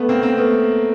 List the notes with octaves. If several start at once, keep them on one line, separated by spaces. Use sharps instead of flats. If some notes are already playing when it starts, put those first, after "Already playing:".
Already playing: A3 B3
A#3 C4
A#3 C4
A3 B3